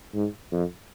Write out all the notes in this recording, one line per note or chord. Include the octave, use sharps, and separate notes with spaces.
G#2
F2